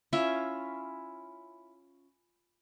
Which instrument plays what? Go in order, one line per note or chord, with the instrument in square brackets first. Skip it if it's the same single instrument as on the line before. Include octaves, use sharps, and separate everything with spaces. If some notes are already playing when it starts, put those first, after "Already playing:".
[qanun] C#4 F4 E5 [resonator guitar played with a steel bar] E4